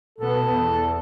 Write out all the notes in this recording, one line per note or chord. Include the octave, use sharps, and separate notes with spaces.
B2 B3 A4
E2